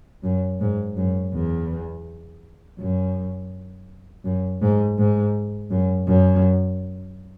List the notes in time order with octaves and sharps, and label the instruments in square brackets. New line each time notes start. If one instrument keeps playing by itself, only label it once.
[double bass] F#2
G#2
F#2
E2
F#2
F#2
G#2
G#2
F#2
F#2